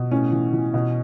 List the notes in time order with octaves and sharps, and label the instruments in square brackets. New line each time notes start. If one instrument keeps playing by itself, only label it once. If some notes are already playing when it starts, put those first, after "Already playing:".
Already playing: [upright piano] B2
A2 C#4
E3
E3
B2